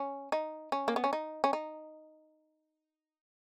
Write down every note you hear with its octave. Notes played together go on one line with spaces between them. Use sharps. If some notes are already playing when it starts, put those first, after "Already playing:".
Already playing: C#4
D#4
C#4
A#3
B3
C#4
D#4
C#4
D#4